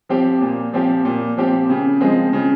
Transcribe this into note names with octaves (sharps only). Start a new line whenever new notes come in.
F3 C4 G4
A#2
F3 C4 G4
A#2
F3 C4 G4
C#3
F3 G#3 C4
C#3